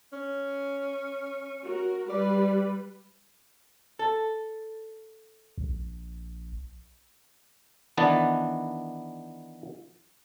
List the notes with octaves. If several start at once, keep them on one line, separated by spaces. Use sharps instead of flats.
C#4
F#4 A#4
G3 B4 D5
A4
A#1
D#3 E3 B3 D4 A5